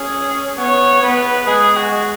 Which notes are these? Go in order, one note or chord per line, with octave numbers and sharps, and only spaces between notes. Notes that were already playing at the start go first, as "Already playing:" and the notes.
Already playing: C#4 G#4
B3 C#5
B3 B4
G#3 G#4
F#4
G#3